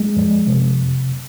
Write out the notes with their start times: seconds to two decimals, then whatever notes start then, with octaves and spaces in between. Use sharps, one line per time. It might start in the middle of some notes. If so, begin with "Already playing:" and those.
Already playing: G#3
0.17 F2
0.47 C3